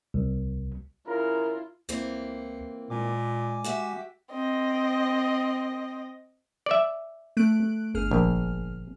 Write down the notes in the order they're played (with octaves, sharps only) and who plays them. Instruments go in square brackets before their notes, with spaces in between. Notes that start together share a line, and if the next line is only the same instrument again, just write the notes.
[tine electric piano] C2
[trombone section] C#3 A#4 [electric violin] E4 F4
[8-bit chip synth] C#2 [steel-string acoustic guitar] E3 A#3 C4
[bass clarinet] A#2 [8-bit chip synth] G#3 G#5 D6
[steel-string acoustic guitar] F#4 G4 E5
[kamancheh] C4 D#5
[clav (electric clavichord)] D5 E5
[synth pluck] A3 F#6 D7
G1 G#4 F6
[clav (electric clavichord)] A#1